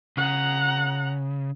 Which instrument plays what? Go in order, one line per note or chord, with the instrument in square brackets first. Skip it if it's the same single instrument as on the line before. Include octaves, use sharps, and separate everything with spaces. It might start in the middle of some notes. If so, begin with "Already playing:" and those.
[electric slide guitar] C#3 [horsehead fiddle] F#5 A#5